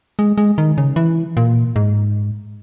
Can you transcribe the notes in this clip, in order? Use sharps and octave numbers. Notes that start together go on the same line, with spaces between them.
G#3
G#3
D#3
C#3
E3
A#2
G#2